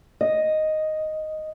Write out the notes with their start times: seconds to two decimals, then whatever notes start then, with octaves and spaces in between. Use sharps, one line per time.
0.21 D#5